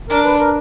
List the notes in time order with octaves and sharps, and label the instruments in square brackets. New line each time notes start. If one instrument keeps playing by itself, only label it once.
[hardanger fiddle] D4 [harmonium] A#4
[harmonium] B4
A#4